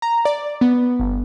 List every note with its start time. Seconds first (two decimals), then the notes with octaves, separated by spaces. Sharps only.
0.02 A#5
0.25 D5
0.61 B3
1.00 G1